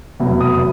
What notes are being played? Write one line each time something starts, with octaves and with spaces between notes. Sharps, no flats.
F1 E2 B2 F#3
D#6